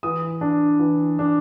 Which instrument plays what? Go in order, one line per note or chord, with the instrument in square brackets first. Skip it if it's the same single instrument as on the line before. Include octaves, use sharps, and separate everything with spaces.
[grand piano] E3 D#6
D4
E3
D4